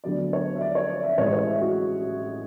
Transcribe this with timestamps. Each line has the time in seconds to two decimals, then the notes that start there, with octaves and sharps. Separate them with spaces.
0.04 D2 D3 F#3 B3 D5
0.33 C#5
0.56 E5
0.61 D5
0.75 C#5
0.90 D5
1.03 E5
1.18 A1 A2 E3 G#3 C#5
1.33 C#5
1.47 E5
1.61 F#4